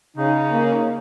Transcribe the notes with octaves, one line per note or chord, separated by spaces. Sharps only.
C#3 D#4
A#3